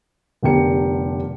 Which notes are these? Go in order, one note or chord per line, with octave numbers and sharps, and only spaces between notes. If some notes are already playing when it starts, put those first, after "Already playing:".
F1 D3 B3 G4 A#4 C#7